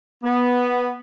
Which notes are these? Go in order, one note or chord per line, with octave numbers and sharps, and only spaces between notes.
B3